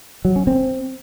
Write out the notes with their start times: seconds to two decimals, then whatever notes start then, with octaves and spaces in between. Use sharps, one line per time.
0.25 F#3
0.36 C#4
0.47 C4